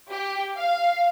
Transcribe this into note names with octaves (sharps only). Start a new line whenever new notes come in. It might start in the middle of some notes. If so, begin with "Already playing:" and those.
G4
F5